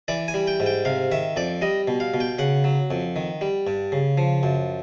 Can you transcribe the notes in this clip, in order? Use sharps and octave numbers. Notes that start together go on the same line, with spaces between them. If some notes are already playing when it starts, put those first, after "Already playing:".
E3 D5
G#5
G3
G5
G#2
G5
C3 F5
D#3 E5
F2 D5
G3 D#5
B2
F5
B2
G5
C#3 F#5
F#3
F2
D#3
G3
G2
C#3
F3
F#2